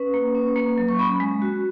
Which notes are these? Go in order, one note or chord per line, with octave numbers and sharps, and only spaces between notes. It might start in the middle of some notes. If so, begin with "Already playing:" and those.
Already playing: C#4 B4
A#3
C#4
A#3
F#3
C#6
C#4 B5
G#3
F#4